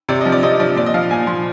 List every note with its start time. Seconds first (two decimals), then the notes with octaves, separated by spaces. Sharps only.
0.09 C3 D5
0.21 D#5
0.25 F3
0.32 D5
0.43 C3 D#5
0.60 F3 D5
0.76 A#2 D5
0.86 D#5
0.94 F3 F5
1.10 A#2 G#5
1.27 F3 C6